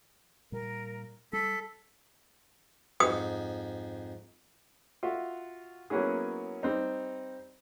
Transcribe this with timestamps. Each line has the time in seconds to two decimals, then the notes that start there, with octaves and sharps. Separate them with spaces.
0.52 A#2 G3 A#4
1.33 G3 A4 B6
3.00 F2 G#2 D#6
5.03 F4 F#4 E5
5.90 F#3 A#3 B3 C#4 E4 G#4
6.63 G3 C4 D#4